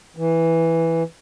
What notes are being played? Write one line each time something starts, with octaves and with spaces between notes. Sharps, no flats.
E3